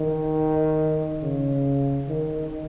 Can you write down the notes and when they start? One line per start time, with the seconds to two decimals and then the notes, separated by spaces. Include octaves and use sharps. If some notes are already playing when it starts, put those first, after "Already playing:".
Already playing: D#3
1.23 C#3
2.08 D#3